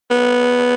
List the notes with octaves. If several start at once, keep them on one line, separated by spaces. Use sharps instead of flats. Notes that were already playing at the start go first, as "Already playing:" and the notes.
B3